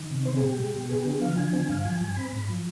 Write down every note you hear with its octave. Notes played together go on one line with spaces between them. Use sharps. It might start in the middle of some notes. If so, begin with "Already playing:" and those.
Already playing: D#3
C3
C4 C5
G#4
B2
G4
G#3
B2
B3 G#4
G4
D3
G#4
F3 F5
D3 G#5
C4 G#5
G2 F5
F3 G#5
G2 G#5
C4 B5
G#2
F3